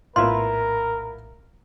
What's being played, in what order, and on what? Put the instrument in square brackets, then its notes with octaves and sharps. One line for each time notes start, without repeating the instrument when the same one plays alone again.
[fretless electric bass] A#1 A2 [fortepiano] B3 E4 F4 [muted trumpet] A#4 [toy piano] C6